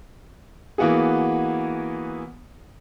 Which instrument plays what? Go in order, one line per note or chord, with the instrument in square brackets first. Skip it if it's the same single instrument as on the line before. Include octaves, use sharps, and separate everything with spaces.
[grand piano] E3 A#3 B3 F#4 G#4